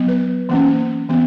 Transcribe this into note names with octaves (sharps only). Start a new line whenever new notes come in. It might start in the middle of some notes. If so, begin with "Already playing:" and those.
Already playing: F#3 B3
B4
E3 A#3 C#4
E3 B3